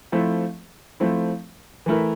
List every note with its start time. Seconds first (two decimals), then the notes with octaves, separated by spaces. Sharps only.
0.12 F3 A3 C4 E4
1.00 F3 A3 C4 E4
1.86 E3 A3 E4 A#4